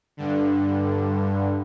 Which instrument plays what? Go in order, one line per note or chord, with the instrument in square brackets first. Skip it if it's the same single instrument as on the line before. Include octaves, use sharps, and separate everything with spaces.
[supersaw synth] G2 D3